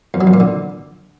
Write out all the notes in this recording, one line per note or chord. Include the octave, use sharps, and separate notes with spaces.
F2
F#3
F2
A#2
D3